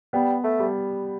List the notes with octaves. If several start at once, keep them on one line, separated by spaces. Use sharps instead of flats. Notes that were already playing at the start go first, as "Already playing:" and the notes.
G3 B3
A3
G3